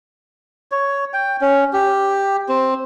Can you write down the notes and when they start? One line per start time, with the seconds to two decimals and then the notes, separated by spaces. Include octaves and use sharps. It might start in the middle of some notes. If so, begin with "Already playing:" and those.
0.72 C#5
1.13 G5
1.41 C#4
1.73 G4
2.49 C4